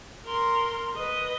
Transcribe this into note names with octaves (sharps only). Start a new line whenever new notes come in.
A#4 C6
B4 D#5